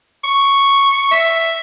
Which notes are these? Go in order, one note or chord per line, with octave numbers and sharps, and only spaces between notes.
C#6
E5